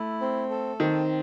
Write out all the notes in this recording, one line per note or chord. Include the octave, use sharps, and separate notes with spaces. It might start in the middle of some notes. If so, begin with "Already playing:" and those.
Already playing: A3 E4
C4
A4
D#3 C4